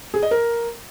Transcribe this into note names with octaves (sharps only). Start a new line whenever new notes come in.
G#4
D#5
A#4